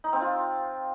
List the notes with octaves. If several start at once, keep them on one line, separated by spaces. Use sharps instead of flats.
D#4
C4
F4